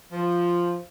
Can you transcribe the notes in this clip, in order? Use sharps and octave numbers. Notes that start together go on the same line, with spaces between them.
F3